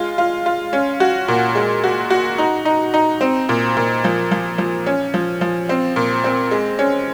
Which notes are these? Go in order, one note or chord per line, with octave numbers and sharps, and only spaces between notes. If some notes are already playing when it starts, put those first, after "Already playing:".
Already playing: G#3 F4
F4
F4
C#4
F#4
A#2
G#3
F#4
F#4
D#4
D#4
D#4
C4
A#2
A#2
F3
F3
F3
C#4
F3
F3
C4
A#2
C4
G#3
C#4